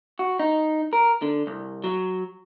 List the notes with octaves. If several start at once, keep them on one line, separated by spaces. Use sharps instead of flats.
F#4
D#4
A#4
D3
C2
F#3